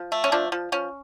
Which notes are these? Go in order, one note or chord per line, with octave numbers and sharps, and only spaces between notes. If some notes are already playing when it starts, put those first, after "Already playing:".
Already playing: F3
A3
C#4
F3 D4
F3
F3 C#4